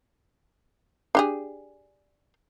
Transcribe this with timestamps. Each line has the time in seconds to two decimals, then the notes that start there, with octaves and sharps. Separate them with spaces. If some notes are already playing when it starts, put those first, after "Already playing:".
1.15 D4 G4 G#4